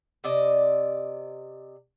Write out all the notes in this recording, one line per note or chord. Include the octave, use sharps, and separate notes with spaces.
C3 D5 D#5